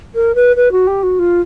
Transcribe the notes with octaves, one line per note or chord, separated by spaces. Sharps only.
A#4
B4
B4
F#4
G4
F#4
F4